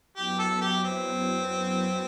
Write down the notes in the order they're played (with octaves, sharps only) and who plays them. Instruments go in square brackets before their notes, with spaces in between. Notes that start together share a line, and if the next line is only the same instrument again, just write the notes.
[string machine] F#2 F#3 B3 E4 [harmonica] G4
[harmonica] A4
G4
C4